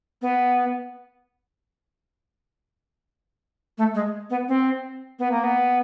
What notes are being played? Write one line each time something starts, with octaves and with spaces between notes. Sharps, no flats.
B3
A3
G#3
B3
C4
B3
A#3
B3